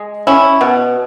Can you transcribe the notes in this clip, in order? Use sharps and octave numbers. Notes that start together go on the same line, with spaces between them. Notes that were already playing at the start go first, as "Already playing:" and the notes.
Already playing: G#3
C#4 E4
B2